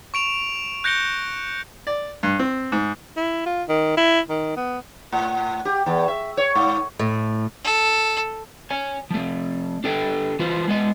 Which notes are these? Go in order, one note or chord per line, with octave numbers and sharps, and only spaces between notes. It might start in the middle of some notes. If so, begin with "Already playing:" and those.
C#6 D7 F7
F#6 G6 A#6 C#7 D7 G7
D5
G2
C4
G#2
E4
F4
D#3
E4
D#3
B3
A2
G4
E2
E5
C#5
G#2
A2
A4
C#5 G#5
F3 A3
D4 G4 A4 B4 G5
E3 F4 B4 C5
G#3 B3 D#5